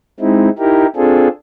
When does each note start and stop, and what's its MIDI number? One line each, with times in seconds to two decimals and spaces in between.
0.20 0.49 56
0.20 0.49 60
0.20 0.49 63
0.20 0.49 64
0.59 0.86 63
0.59 0.86 64
0.59 0.86 67
0.59 0.86 70
0.96 1.28 60
0.96 1.28 62
0.96 1.28 65
0.96 1.28 68
0.96 1.28 69